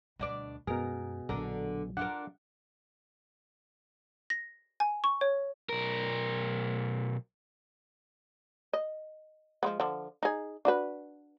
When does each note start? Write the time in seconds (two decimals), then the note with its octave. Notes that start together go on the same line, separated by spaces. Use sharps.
0.19 D2 B2 D4 D5
0.67 F#2 B2 G#3 G#4 A#4
1.29 A#1 D3 F#3 D4 A#4
1.97 D4 F4 A#4 F#5
4.30 A#6
4.80 G#5
5.04 C#6
5.21 C#5
5.69 B1 A#4
8.73 D#5
9.63 F3 G#3 B3
9.80 D3 F3
10.23 D#4 G#4
10.65 D4 F#4 B4